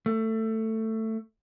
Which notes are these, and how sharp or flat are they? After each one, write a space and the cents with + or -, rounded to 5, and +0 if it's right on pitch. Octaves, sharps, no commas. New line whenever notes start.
A3 +15